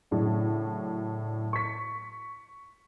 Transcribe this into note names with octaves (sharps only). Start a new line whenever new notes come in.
A2 C#3 F#3 D4
C#6 B6